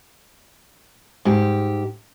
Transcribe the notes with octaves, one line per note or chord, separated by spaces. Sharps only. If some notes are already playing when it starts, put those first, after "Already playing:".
G#2 G4